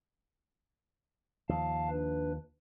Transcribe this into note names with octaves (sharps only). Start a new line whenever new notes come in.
D#2 F3 F5 A5
D4 B4